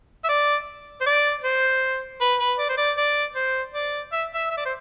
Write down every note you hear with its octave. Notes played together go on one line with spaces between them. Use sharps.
E5
D5
C5
D5
C5
B4
B4
D5
C5
D5
D5
C5
D5
E5
E5
E5
D5
C5